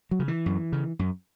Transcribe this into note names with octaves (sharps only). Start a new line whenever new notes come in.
F#3
C#3
E3
F#2
C#3
F#2